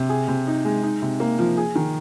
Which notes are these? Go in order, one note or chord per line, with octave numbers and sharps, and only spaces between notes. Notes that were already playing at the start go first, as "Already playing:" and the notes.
Already playing: C3
G#4
C3
D#4
G#3
D#4
C3
A#3
F3
G#4
D#3